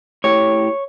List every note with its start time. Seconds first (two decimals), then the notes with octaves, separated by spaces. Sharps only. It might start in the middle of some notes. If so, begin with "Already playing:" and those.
0.24 A2 G4 C#5